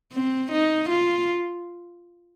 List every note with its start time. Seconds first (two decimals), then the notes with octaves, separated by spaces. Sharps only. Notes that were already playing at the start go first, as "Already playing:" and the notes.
0.13 C4
0.52 D#4
0.90 F4